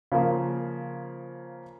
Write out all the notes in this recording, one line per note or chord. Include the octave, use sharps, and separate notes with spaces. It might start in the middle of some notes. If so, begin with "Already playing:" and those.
C#3 F3 A#3 F4